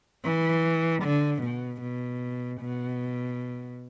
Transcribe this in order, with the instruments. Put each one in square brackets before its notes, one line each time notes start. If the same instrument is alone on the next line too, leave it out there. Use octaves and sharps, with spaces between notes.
[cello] E3
D3
B2
B2
B2